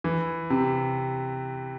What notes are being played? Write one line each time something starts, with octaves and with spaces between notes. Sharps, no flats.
E3
C3